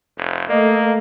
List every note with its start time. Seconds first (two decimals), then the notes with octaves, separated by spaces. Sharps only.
0.17 F1
0.49 A3 A#3 D#5